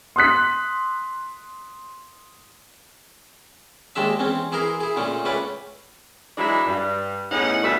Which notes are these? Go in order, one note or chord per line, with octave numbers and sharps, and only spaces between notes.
C6 D#6 F#6 B6
D#2 D#3 G#3 D4 E5
E2 C4 C#4
E3 E4 G#4 A#4 C6
E4 G#4
A#2 D3 A3 C#4
C#2 A3 C#4 B4 D5
E3 F#3 G#3 D4 E4
G2
E2 A2 C#4 D#4 F#5
D2 B2 G3 A3 B4 E5